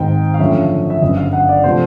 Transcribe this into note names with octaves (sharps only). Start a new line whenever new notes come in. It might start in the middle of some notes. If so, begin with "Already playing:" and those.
Already playing: G#1 G#2 D#3 G5
F5
F#2 D3 F3 A3 C#4 E5
E5
G1 F#2 C#3 D#5
F5
F#5
D5
C3 F3 A3 C5